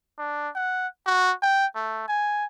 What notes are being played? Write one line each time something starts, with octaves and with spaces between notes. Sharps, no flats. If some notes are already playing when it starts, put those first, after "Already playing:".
D4
F#5
F#4
G5
A3
G#5